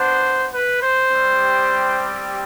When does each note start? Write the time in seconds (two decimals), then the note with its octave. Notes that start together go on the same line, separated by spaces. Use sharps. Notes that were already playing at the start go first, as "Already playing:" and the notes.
Already playing: B3 D4 F#4 C5
0.53 B4
0.81 C5
1.10 G3 C4 G4